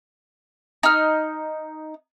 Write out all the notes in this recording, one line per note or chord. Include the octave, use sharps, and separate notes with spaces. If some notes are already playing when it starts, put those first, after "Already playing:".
D#4 F6